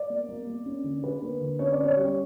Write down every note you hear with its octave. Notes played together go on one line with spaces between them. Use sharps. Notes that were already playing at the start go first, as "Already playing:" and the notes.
Already playing: D5
A#3
A#3
A#3
C#4
D3
D3 B4
A#3
D3
C#4 C#5
D5
C#4
C#5
G3